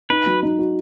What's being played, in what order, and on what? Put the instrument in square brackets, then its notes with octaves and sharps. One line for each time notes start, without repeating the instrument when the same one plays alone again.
[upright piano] D#4 [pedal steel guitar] B4
[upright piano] F#3
D#4
F#4